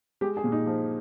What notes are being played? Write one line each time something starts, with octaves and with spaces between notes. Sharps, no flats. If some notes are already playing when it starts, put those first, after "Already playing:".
G#3 G4
G#4
A#2
D#4
F3